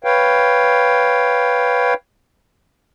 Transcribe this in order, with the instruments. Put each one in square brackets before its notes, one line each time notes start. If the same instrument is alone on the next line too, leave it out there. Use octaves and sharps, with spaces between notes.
[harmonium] B4 C#5 F5 G5